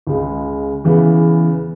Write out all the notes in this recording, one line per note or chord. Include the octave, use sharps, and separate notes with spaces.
C#2 C#3 G#3
E2 C#3 E3 B3